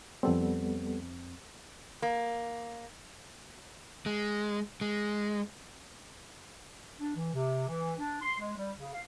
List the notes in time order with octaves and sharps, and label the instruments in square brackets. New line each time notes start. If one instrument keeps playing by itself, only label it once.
[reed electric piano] F2 C4 [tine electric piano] G3 B3 A4
[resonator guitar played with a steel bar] A#3
[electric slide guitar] G#3
G#3
[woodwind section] D4
E3
C3
E3
D4
C6
G#3
G3
C#3
F5